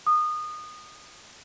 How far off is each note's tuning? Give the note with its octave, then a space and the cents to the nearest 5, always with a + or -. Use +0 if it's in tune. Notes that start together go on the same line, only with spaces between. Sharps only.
D#6 -25